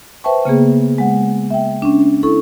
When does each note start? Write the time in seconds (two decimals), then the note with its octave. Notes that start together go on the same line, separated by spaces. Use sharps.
0.24 B4 C5 E5 G5 A5 C#6
0.45 C#3 A#3 B3 G#4
0.98 G#3 F#5
1.50 E5 G5
1.82 C#4 D4
2.23 E4 A4 C#6